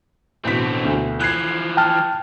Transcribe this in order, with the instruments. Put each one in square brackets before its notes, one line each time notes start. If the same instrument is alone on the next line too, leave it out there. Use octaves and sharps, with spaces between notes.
[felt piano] A1 B2 B6 [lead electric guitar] D3 C4
[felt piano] D2 B2
[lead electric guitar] E3 F3 [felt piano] F#6 G#6 C7
[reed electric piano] G5 A5 F6